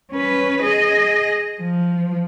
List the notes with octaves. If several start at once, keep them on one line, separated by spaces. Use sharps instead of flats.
C#4 B4
G#4 D#5
F3